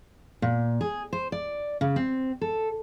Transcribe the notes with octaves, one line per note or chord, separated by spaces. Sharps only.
A#2
G#4
C5
D5
C#3
C4
A4